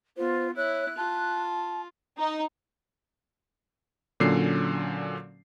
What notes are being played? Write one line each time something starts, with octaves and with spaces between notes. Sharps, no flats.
B3 F4 C5
E4 C#5 F#6
F4 A5
D#4
A#2 D3 F#3 C#4 C7